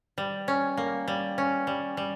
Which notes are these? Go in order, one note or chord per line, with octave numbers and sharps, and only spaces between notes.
G3
C#4
A#3
G3
C#4
G3
G3